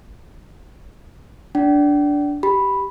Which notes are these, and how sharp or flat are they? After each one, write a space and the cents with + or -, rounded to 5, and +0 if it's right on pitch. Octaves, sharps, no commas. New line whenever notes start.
D4 -10 D5 -15 G5 -40
G4 -10 B5 +0